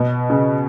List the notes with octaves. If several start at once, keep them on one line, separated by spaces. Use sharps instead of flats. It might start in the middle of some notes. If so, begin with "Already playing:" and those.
Already playing: B2
C#3